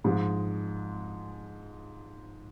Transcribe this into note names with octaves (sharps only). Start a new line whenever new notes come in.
G#2 F3 G#3